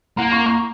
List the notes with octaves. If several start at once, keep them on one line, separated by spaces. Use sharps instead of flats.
A#3 F#5 A#5
A#5 C#6
A#5 C#6